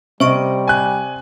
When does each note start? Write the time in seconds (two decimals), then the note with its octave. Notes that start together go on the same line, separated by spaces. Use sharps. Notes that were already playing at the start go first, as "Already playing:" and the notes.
0.20 C3 G3 C5 D#5 C#6 D7
0.68 G#5 F#6